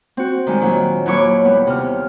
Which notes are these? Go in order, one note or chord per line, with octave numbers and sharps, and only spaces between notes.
C4 F#4
D#3 G3 G#3
A#2 D#3 F#3
D#2 F#3 E4 C#5 C#6 D6
G3 B3
C3 F6